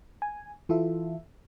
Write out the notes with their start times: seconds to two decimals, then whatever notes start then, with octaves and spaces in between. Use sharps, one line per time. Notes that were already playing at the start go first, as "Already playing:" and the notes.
0.22 G#5
0.69 E3 E4 F4 A4 E5